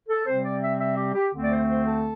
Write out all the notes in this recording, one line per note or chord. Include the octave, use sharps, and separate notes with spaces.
A4
C3 G3 C4 C5
D5
E5
E5
G4
G4
D2 D3 A3 C4
D5
C5
C5
A4